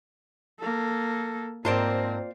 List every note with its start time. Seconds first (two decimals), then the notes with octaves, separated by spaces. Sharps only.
0.60 A#3 A4
1.65 G#2 A#3 C4 F4 A#4 C5 D5 A5